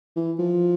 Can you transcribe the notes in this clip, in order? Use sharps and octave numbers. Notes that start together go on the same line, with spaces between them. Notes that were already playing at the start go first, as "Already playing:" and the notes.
E3
F3